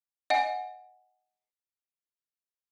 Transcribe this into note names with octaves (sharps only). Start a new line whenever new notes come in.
D#5 F#5 G#5